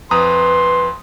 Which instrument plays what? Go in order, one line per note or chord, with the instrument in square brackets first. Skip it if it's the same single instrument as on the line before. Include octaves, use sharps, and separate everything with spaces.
[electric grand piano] F2 A#5 D#6 [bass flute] B4 [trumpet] C6